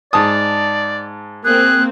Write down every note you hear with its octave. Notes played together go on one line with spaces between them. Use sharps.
G#2 D5 A5 D#6
A#3 C4 G#4 F#6